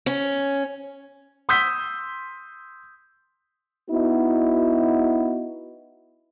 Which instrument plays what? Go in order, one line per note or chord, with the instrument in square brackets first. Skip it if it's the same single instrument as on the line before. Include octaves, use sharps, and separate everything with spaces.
[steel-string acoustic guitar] C#4
[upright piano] C6 D#6 E6 G6 B6 G7
[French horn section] B3 D#4 E4 F#4